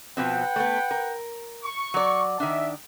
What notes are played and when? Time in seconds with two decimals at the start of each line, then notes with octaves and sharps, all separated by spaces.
0.17 B2 F3 C4 B4 F#5 G5
0.56 A3 B3
0.91 A#4
1.63 C#6
1.94 F#3 D5
2.40 D#3 D4 E5